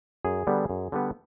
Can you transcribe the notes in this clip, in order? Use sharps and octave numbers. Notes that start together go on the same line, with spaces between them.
F#2 G#4
D3 G3 B3
F#2
D3 G3 B3